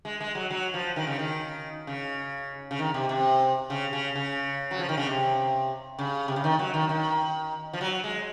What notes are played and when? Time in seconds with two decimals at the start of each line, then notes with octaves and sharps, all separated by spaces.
0.05 G#3
0.21 G#3
0.35 F#3
0.50 F#3
0.74 F3
0.96 D#3
1.07 C#3
1.19 D#3
1.87 C#3
2.71 C#3
2.79 D#3
2.94 C3
3.09 C3
3.70 C#3
3.93 C#3
4.15 C#3
4.71 F#3
4.79 F3
4.89 D#3
4.97 C#3
5.06 C3
5.99 C#3
6.28 C3
6.36 C#3
6.44 D#3
6.59 F#3
6.74 D#3
6.89 D#3
7.73 F3
7.81 F#3
8.04 G#3